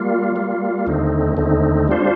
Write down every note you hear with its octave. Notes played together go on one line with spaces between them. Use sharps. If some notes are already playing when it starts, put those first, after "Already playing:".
Already playing: G3 A#3 F4
G3 A#3 F4
D#2 D3 A3 C4 D#4
D#2 D3 A3 C4 D#4
G3 D4 F4 C5